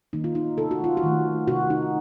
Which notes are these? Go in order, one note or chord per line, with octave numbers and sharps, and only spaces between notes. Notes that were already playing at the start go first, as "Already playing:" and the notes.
D#3 A#3 D#4
F4
D#4
C3 A4
F#4
F4
F#4
D#3 A3
C3 F#4
D#4